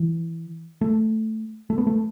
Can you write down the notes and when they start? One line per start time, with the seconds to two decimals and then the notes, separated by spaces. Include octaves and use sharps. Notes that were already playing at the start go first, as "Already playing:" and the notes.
Already playing: E3
0.81 A3
1.70 A3
1.78 B3
1.87 A3